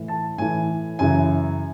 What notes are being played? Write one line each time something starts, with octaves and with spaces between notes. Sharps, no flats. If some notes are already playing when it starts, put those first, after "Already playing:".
Already playing: A2 E3
A5
A2 E3 G#5
F#2 C#3 E3 G#5